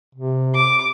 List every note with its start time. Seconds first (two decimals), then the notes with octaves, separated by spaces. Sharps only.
0.15 C3
0.55 D6